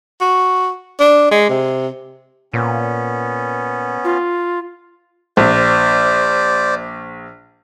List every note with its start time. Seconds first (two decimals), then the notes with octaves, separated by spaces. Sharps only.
0.21 F#4
1.00 D4
1.31 G#3
1.49 C3
2.53 A#2 B3 C#4
4.04 F4
5.37 A#1 C5 D5